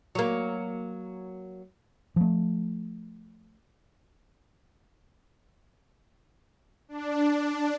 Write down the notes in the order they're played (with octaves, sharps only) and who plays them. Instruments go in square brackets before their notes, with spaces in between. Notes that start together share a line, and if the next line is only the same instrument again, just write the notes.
[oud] F#3 A#3
[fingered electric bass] F3 A3
[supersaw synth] D4